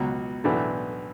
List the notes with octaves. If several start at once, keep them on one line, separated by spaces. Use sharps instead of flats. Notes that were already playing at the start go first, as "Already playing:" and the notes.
Already playing: C#2 B2 F#3
B1 A2 E3 A3 D4